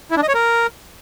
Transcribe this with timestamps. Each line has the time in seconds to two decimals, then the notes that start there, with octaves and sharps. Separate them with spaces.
0.11 E4
0.17 D4
0.23 D#5
0.29 C#5
0.34 A#4